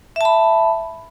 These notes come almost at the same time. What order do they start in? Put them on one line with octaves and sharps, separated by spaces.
E5 A5 B5